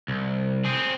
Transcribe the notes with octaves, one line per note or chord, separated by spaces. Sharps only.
C2
C4 G#4